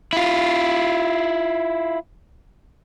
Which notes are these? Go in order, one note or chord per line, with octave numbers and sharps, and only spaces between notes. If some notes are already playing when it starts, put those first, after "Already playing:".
E4 F4